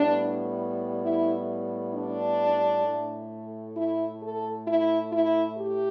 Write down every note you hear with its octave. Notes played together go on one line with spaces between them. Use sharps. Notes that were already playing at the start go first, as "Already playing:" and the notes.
Already playing: A2 G3 B3 D4
E4
D4
A2 A3
E4
A4
E4
E4
G4